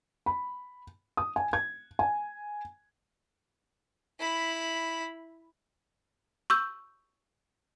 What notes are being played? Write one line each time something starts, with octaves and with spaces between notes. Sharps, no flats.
B5
D#6
G#5
G#6
G#5
E4 B5
C#6 E6 G6